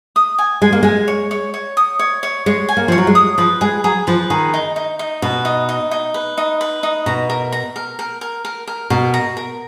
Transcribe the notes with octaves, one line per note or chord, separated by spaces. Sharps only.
D#6
G#5
G#3 G#5
A#3
G#3 G#5
C#5
C#5
C#5
D#6
C#5
C#5
G#3 C#5
G#5
A#3
F3 C#5
F#3
G#3
D#6
F3 B4
G#3 G#4
F#3 G#4
F3 B4
D#3 G#4
D#4
D#4
D#4
B2 B4
D#4
D#4
D#4
B4
D#4
B4
D#4
B2 A#5
A#4
A#5
A#4
A#4
A#4
A#4
A#4
B2 A#4
A#5
A#4